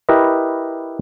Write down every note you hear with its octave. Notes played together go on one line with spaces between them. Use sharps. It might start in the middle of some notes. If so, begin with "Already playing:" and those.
E4 G4 A#4 B4 D#5